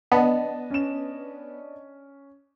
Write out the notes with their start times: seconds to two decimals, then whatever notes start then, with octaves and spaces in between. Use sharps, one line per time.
0.12 B3 D4 D#5 A5
0.70 C#4 E7